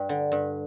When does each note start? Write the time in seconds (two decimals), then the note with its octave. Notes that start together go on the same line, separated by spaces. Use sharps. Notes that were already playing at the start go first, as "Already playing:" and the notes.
Already playing: G2 G3 F5 G5
0.09 D3
0.32 G2